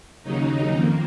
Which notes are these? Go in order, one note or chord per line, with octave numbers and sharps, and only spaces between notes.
D#2 C#3 F#3 D#4
F2 D#3 A#3